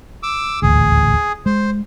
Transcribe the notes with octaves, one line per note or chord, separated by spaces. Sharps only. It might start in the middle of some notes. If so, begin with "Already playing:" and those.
D6 E6
D#1 A1 D2 G#4
G#3 C5